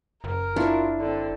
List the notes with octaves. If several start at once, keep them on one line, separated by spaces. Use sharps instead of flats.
F#1 A#4
D4 E4 F4 C#5
D3 C4